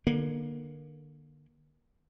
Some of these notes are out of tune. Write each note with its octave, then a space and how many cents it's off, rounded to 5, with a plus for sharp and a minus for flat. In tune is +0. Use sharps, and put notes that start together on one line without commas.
D3 +35 A#3 +25